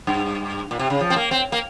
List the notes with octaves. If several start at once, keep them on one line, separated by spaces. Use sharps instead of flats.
G2
A#2
C3
C#3
F3
C4
A#3
C4
A#3